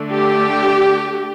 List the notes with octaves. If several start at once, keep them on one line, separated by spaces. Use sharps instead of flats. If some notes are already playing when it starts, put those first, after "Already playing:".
Already playing: D3 A3 D4
G4